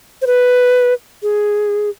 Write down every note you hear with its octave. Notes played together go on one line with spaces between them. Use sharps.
C5
B4
G#4